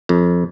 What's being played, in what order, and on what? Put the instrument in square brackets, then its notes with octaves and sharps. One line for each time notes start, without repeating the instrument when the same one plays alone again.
[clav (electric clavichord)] F2